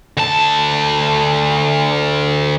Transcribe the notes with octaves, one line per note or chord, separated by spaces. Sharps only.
D2 A5